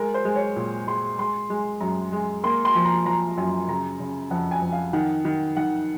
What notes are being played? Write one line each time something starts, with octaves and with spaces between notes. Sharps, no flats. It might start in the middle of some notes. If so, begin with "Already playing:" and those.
Already playing: G#3 A#4
C5
G#3
C#5
A#2
G#3 C6
G#3 C6
G#3
F#2 A#5
G#3
A#3 C6
C6
F3
A#5
F3 A#5
F#2 G#5
C#3 A#5
C#3
F2 F#5
G#5
F2
F5
D#3 F#5
D#3
D#3 F#5